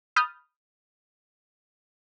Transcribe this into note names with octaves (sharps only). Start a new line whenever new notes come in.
B5 D#6 F6 G6 A6